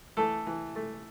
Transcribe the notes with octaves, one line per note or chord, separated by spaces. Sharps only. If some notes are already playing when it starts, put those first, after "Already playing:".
E3 A3 A4
E3
A3